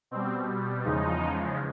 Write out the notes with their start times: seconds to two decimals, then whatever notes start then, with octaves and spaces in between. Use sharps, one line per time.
0.11 B2 G3 C4
0.84 E2 C#3 F3 G#3 D#4